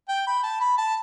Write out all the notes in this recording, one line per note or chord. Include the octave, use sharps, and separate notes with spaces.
G5
B5
A5
B5
A5